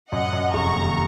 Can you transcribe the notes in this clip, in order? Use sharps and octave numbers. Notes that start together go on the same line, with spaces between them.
F#2 D#5 F#5
F#2
F1 A#5 C#6
D#2